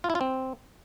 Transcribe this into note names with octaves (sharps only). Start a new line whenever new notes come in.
F4
E4
F4
C4